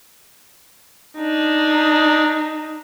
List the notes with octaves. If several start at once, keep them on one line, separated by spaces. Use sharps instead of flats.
D4 D#4